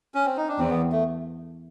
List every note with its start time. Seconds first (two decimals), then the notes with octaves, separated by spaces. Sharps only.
0.14 C#4
0.25 C4
0.37 D#4
0.48 D4
0.59 E2 C4
0.70 B3
0.92 A3